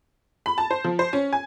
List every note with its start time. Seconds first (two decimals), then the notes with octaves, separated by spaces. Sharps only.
0.46 B5
0.58 A5
0.71 C5
0.84 F3
0.99 C5
1.13 C#4
1.33 G#5